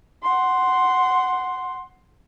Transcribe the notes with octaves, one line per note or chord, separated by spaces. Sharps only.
F#5 C6